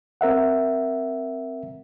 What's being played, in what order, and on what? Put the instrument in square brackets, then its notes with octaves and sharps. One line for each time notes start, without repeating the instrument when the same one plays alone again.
[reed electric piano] C4 A#4 E5 F#5